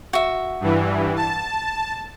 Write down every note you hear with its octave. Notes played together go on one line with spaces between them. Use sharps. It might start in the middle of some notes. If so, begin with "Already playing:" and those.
F#4 E5
G2 E3
A5